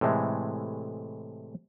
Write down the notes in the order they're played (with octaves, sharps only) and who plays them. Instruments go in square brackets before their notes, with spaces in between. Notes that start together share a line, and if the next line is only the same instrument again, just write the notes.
[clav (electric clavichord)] A2 C3 E3 G#3 A3